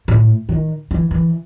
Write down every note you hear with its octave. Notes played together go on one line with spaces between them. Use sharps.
A2
D#3
E3
E3